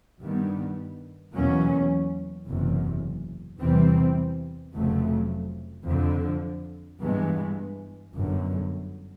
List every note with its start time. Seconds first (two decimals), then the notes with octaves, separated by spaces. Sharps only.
0.21 G2 D#3 G3 B3
1.34 E2 B2 F#3 A#3 C#4
2.47 F#1 E2 C3
3.61 E2 C3 E3 G3 C4
4.74 F1 F2 C#3 F#3 A3
5.88 F2 D3 F3
7.01 G2 E3 G#3 B3
8.15 G1 F#2 D3